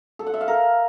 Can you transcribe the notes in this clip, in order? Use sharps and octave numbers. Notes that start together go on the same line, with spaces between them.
A4
F#5
E5
F5
A#4